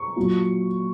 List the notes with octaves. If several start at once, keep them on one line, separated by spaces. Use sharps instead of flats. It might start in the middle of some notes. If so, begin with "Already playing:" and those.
Already playing: C#6
A#2 F#3